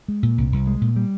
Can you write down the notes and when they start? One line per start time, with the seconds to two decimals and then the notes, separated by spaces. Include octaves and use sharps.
0.08 G#3
0.23 A#2
0.38 C2
0.52 C2
0.67 G#3
0.81 A#2
0.96 G3